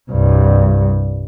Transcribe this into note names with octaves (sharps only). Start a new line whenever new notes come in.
C2 G2